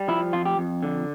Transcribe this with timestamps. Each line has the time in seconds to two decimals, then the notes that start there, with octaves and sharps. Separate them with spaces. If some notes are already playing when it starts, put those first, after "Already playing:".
Already playing: G3
0.08 F3 E4
0.33 F2 F4
0.45 G4
0.58 F2
0.83 D3